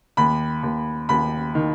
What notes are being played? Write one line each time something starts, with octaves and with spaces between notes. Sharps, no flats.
D#2 B5
D#2
D#2 B5
D#3